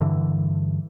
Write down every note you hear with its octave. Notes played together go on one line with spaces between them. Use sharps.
G2 D3 E3